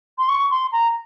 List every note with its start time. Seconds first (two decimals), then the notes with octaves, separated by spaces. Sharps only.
0.18 C6
0.28 C#6
0.51 C6
0.72 A#5